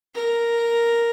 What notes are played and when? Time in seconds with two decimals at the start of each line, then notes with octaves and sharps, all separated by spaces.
0.15 A#4